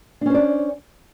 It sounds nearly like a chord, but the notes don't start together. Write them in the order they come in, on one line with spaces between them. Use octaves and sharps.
D4 C#4 C5 D5